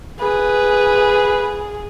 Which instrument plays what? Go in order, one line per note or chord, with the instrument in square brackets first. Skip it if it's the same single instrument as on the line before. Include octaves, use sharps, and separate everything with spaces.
[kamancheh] G#4 [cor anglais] B4